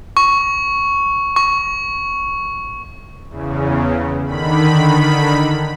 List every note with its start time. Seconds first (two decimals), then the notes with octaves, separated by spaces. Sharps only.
0.17 C#6
1.36 C#6
3.28 E2 C#3
4.25 D3 D#3 B5